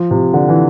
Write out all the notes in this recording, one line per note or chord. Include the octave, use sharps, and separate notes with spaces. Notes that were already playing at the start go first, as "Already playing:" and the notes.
Already playing: F3
C3
D3
E3